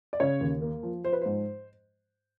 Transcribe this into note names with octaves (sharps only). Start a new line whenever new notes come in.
D5
C#3 C#5
D#2
A#3
F3
F3 C5
B4
G#2 C5